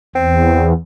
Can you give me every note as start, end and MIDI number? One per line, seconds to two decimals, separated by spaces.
0.16 0.73 40
0.16 0.70 60